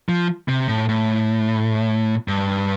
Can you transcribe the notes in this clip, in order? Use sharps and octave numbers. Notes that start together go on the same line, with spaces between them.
F3
C3
A2
A2
G2